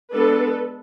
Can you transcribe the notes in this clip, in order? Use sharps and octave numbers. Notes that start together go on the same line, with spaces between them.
G#3 B3 D4 A4 B4